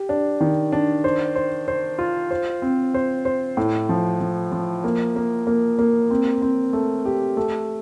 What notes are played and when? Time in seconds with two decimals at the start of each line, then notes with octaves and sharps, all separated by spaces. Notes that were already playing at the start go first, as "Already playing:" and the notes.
Already playing: G4
0.09 D4
0.40 D#3
0.72 D4
1.04 C5
1.36 C5
1.68 C5
1.99 F4
2.31 C5
2.62 C4
2.94 C5
3.25 C5
3.57 A2
3.89 F3
4.20 F3
4.52 F3
4.84 A#3
5.16 A#3
5.47 A#3
5.79 A#3
6.10 C4
6.42 C4
6.73 A3
7.05 G4
7.37 A3